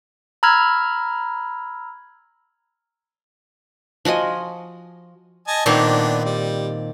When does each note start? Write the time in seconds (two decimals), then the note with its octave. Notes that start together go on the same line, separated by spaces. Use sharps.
0.43 A#5 B5 E6 F6 G#6
4.05 F3 F#4 D#5 G#5
5.48 D#5 G#5 A5
5.66 A#2 D#3 B3 C4 D4
6.25 G3